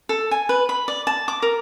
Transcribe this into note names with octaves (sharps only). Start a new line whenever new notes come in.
A4
G#5
B4
B5
D5
A5
D6
A#4